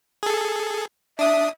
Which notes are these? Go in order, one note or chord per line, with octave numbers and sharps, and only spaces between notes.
G#4 A4
D4 E5 D#6